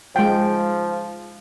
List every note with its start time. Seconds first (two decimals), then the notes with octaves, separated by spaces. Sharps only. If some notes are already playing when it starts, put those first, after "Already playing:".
0.16 F3 G#3 G5